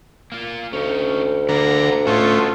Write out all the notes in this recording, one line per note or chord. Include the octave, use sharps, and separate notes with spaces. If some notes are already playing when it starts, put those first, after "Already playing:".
A#3 F4
D2 C#4 D#4
D3 A#3 B3 A#5
A2 A3 C#4 F4 F#4 D#5